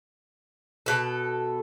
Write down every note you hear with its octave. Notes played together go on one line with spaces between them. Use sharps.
B2 A4